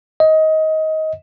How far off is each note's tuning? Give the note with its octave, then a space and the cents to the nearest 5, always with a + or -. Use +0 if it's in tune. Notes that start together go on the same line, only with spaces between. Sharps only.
D#5 +20